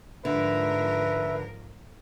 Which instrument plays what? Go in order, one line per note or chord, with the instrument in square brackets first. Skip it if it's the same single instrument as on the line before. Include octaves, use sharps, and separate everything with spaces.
[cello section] G#2 F3 A#4 [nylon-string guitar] D3 [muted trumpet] B4 [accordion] E5